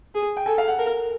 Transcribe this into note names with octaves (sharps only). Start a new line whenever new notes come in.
G#4
G5
A4 G#5
F5
F#5
A#4